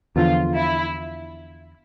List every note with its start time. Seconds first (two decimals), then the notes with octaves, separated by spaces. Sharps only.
0.16 E2 D3 F3 F4
0.56 E4